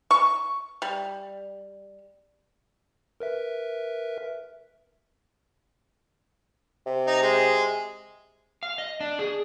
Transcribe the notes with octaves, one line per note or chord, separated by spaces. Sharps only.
C#6
G3
A#4 B4 E5
C3
D#4
G#3
F5
D#5
D4
G#4